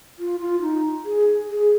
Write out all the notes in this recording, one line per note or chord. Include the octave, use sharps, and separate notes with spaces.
F4
F4
D#4
G#4
G#4